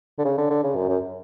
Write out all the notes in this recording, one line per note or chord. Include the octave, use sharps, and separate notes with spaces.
D3
C#3
D3
D3
C#3
F#2
F#2